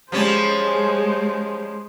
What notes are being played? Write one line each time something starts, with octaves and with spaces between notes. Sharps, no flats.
F3 G3 G#3 C#4 G#4 C5